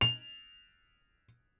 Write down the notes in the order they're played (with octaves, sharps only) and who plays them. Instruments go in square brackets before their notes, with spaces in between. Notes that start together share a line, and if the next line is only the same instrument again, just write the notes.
[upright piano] F7